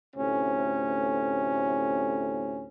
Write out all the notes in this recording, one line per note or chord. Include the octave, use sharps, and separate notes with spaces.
D2 A2 C3 C#4